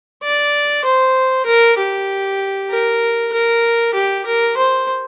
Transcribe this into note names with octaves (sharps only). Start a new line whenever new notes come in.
D5
C5
A#4
G4
A#4
A#4
G4
A#4
C5